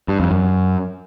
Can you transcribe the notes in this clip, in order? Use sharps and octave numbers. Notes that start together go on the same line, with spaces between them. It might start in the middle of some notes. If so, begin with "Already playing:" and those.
G2
F2
F#2